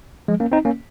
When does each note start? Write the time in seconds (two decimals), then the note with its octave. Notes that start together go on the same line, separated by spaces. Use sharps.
0.28 F3 G#3
0.40 A#3 C#4
0.52 C4 D#4
0.65 A#3 C#4